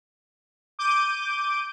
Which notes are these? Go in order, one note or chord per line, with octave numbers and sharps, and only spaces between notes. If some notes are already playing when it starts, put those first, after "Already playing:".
D6 G6 D#7